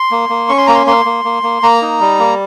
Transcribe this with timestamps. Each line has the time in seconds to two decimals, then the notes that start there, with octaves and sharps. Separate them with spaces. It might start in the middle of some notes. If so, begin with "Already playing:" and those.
Already playing: C6
0.11 A#3
0.29 A#3
0.49 C#4 C#6
0.58 C6
0.67 A#3 A#5
0.75 C6
0.86 A#3 C6
1.05 A#3
1.25 A#3
1.43 A#3
1.63 A#3 A#5
1.82 D#4
2.00 G3
2.19 A#3